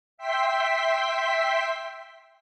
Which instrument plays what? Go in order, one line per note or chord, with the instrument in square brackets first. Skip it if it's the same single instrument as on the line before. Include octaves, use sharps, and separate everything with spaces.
[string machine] E5 G5 C6 B6